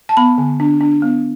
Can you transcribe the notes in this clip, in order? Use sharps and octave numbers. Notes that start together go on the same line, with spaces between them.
A5
B3 B5
D3
D4
D4
B3